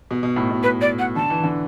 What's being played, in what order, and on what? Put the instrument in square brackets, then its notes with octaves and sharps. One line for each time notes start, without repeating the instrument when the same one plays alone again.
[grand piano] B2
B2
A2
B2
[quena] B4
D5
F#5
[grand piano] D3 [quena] A5
[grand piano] E3
D3